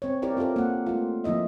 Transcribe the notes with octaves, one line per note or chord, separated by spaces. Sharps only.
C4 C#5
E4 G4 A#4 C#5 D5
C4 F4 G4 A4 A#4
A#3 F#5
A3 F4
F3 A#3 E4 D#5 E5